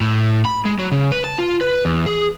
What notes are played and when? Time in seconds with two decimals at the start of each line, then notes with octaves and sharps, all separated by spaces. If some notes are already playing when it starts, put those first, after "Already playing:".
0.01 A2
0.45 B5
0.66 G#3
0.79 F#3
0.92 C#3
1.12 B4
1.24 A5
1.39 F4
1.61 B4
1.85 E2
2.06 G#4